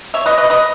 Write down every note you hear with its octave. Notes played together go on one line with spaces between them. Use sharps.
C#5 E5
B4 D#5
B4 D#5
B4 D#5